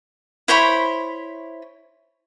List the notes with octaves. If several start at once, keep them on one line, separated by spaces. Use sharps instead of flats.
E4 C5 C#5 B5